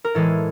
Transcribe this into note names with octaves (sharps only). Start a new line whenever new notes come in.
A#4
A2 E3 G#3 A4